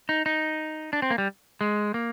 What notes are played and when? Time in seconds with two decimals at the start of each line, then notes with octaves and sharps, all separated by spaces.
0.09 D#4
0.26 D#4
0.93 D4
1.02 C4
1.11 A#3
1.18 G3
1.61 G#3
1.94 A#3